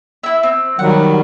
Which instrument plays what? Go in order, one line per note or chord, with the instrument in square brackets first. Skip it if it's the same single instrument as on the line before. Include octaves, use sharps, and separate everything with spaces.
[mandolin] E4 E5
C4
[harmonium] D#3 F#3 G3 [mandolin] F#5